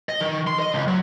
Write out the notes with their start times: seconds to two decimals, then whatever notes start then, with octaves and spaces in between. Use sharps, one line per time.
0.09 D#5
0.21 D#3
0.47 C6
0.60 D#5
0.74 C#2
0.88 F#3